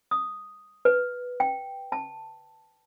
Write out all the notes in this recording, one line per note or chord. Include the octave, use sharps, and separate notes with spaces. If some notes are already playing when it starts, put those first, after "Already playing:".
D#6
B4
G5
A5